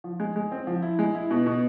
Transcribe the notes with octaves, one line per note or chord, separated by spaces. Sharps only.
F3
G#3
G#3
C4
F3
E4
G#3
E4
B2
B2